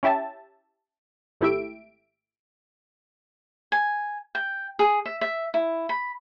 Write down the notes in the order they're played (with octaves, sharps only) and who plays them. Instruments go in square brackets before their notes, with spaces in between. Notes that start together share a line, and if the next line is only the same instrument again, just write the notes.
[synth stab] C#4 E4 G4 E5 A5
G#1 A3 E4 G4 E5 D7
[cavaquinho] G#5
G5
G#4
E5
E5
E4
B5